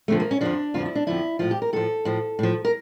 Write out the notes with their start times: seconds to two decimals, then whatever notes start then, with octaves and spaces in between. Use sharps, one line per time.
0.08 F2 D3 F3 A3
0.20 A#3
0.31 C#4
0.41 F2 D3 F3 D4
0.74 F2 D3 F3 F4
0.86 E4
0.95 D4
1.07 F2 D3 F3 E4
1.39 A2 F3 F4
1.51 G4
1.62 A#4
1.73 A2 F3 A4
2.05 A2 F3
2.39 A2 F3
2.65 A#4